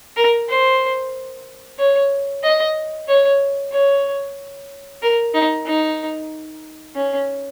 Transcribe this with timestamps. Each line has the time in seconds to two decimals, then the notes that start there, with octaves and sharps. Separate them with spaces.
0.16 A#4
0.49 C5
1.78 C#5
2.43 D#5
3.08 C#5
3.72 C#5
5.02 A#4
5.34 D#4
5.66 D#4
6.96 C#4